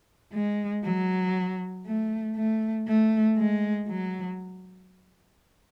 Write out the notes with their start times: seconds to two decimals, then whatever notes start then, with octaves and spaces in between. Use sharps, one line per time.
0.33 G#3
0.84 F#3
1.86 A3
2.36 A3
2.87 A3
3.37 G#3
3.88 F#3